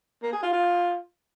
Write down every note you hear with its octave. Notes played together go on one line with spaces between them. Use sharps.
A#3
G#4
F4
F4